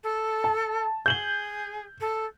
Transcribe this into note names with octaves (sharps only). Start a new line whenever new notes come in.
A4
A5
G#4 G6 F#7 G7
A4